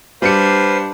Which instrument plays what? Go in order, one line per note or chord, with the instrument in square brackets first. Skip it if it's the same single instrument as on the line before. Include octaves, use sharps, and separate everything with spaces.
[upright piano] G3 C#7 [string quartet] D4 [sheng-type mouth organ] B4 C5 F5